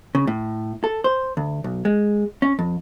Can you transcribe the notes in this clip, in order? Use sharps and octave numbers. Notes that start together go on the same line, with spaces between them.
C#3
A2
A4
C5
D2
B1
G#3
C#4
F2